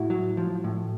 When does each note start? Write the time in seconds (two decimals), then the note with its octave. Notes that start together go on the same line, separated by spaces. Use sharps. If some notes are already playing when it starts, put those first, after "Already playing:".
Already playing: A2 E4 F#4
0.10 F#3
0.37 F3
0.64 A2